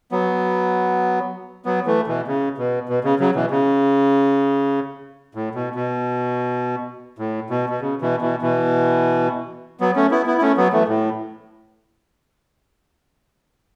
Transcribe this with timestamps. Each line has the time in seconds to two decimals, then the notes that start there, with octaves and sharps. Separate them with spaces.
0.12 F#3 B3
1.65 F#3 B3
1.86 E3 A3
2.07 B2 E3
2.27 C#3
2.58 B2
2.89 B2
3.04 C#3
3.19 C#3 F#3
3.35 B2 E3
3.51 C#3
5.35 A2
5.55 B2
5.75 B2
7.19 A2
7.50 B2
7.70 B2
7.81 C#3
8.01 B2 E3
8.21 B2 E3
8.42 B2 E3
9.80 F#3 B3
9.96 A3 C#4
10.11 B3 E4
10.26 B3 E4
10.38 E4
10.42 A3 C#4
10.57 F#3 B3
10.73 E3 A3
10.88 A2